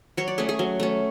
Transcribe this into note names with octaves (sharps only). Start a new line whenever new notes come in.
F#3 C#5
D5
A3 C#4 G#4
G#4
F#3
A3 C#4